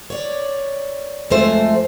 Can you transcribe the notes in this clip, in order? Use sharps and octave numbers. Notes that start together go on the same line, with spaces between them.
C#5 D5
F2 G#3 A3 F4 C5 E5